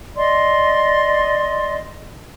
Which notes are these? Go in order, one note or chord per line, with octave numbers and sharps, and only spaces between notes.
D5 D#5 C6